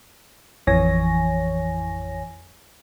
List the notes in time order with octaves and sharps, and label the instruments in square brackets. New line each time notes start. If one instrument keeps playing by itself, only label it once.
[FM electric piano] A1 F2 E3 C#5 G#5 A#6